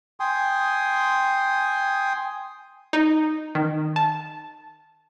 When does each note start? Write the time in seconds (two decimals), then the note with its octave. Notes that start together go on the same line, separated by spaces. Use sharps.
0.20 G5 G#5 C6 D#6
2.93 D#4
3.55 D#3
3.96 A5